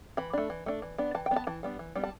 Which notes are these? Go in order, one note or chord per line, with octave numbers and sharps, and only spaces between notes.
E3 B5
A3 D4
E3
A3 D4
E3
B3 D4
E3 A5
G5
B3 D4
A5
E3 A5
G3 B3 D4
E3
G3 B3 D4
A5